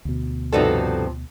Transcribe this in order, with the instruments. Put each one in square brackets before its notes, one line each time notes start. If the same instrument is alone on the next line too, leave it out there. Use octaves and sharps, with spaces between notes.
[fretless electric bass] D2 B2
[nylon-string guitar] G2 C3 F3 [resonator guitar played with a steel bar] D#4 F#4 A4